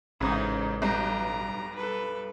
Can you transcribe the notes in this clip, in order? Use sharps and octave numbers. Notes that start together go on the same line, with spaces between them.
A1 G#2 C#3 D#4
B1 G2 A#5 G6
A4 B4